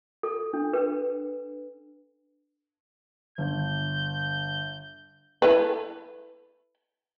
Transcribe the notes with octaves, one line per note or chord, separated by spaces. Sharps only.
A4
D4
B4
G1 G6
E4 A4 B4